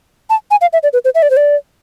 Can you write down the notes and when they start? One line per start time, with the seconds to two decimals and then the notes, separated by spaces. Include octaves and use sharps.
0.30 A5
0.51 G#5
0.61 F5
0.73 E5
0.83 D5
0.93 B4
1.05 C5
1.15 E5
1.22 D5
1.30 C5
1.37 D5